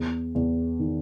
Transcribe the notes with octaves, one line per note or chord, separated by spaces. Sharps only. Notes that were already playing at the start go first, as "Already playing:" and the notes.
Already playing: E2
E2
D#3